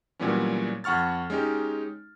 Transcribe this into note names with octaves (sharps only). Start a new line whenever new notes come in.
A#2 E3 F#3 G3 B3 C#4
F2 F#5 C#6 F6 A6
G#3 C#4 D#4 G4